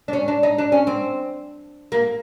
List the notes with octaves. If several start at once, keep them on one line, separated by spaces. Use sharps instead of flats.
D4
C#4
D4
D#4
D4
C#4
C4
A#3